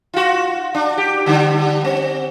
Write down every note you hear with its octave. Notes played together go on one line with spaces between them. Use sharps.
F4 F#4
D4
G4
D3 G3 D4
C4